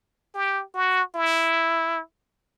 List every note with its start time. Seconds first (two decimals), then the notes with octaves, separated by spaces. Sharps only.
0.35 G4
0.74 F#4
1.15 E4